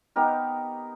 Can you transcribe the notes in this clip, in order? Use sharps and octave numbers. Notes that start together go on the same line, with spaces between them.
B3 D#4 G4 A#4